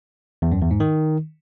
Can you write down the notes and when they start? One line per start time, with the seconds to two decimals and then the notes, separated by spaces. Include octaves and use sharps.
0.42 E2
0.52 F#2
0.61 E2
0.71 G#2
0.80 D#3